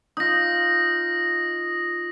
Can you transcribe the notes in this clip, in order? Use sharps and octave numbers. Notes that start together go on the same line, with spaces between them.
D#4 F4 D#6 A#6